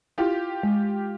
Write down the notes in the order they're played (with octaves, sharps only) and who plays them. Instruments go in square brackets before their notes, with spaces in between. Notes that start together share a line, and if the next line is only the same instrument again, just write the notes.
[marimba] E4 [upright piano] F4 G4
[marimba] G#3